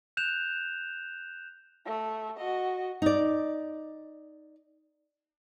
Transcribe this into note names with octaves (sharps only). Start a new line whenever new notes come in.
F#6 G6 E7 F7
A3
F#4 D#5
D#4 D5